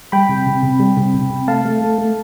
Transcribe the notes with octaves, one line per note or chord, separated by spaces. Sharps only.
G3 G5 B5
C3
C3
C3
G3
C3
C3
C3
A3 F5 A5
A3
A3
A3